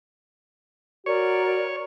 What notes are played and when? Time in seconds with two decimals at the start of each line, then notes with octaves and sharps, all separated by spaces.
1.06 F#4 A#4 C#5 D5